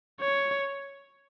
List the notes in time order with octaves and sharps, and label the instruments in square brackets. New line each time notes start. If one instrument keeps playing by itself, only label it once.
[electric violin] C#5